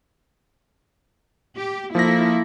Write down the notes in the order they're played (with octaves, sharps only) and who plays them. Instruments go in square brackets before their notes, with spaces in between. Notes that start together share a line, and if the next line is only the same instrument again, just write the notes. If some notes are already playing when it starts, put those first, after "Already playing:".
[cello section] G4
[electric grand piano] F3 A#6 [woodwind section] A#3 [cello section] E4 A4